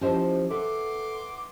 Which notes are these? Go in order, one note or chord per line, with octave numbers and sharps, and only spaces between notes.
F3 C#4 E4 G4 C5 D#5
A4 B4 E5 F#5 C6 D6